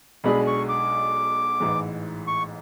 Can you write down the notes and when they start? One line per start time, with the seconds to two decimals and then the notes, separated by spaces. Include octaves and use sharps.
0.24 B1 B2 G#3 D4 G#4 B5
0.47 C#6
0.69 D6
1.60 A1 G#2 E3 G#3
2.27 C#6